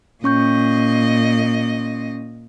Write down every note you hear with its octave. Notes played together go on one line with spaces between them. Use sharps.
A#2 C#4 D#5 C#6 G6